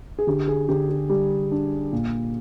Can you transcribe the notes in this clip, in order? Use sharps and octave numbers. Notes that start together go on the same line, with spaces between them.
G#4
D3 G4
G#4
D3 G4
G4
G3
D4
A#2